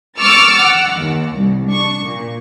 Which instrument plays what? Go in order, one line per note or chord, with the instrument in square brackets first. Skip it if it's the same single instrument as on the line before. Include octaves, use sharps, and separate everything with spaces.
[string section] C#6 D6 E6 F6 A6 C#7
F#5
D#2
C2
D4 C#6
A#2